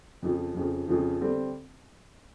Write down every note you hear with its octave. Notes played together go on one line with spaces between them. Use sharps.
F2 C#3 F3
F2 C#3 F3
F2 C#3 F3
D3 G3 C4